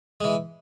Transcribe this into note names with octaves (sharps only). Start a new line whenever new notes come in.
E3 G#3